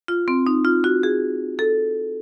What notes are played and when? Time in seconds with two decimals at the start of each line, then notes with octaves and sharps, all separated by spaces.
0.08 F4
0.28 C4
0.47 D#4
0.65 F4
0.84 F#4
1.03 G#4
1.59 A4